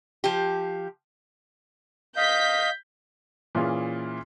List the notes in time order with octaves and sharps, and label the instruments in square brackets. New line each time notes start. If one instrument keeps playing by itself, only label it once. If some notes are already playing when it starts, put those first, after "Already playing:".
[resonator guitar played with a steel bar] F3 G4
[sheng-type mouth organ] D#5 F5 [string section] G6 B6
[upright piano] A#2 E3 C#4 F4 G#4